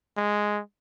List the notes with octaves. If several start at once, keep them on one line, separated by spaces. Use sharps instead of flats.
G#3